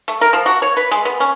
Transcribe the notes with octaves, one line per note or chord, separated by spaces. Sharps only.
A3
A#4
F3
F#4
C#5
B4
G#3
B3
C#4